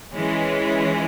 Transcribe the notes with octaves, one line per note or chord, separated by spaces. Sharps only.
E3 G#3 C#4